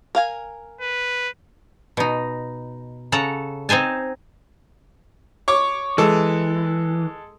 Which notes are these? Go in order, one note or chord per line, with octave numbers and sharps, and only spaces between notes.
A#4 F5 G#5
B4
B2 D#4
C#3 A4 F#5 A#5
C4 D#4 C5 G#5 A5
C#5 C#6 D6
E3 G#3 A4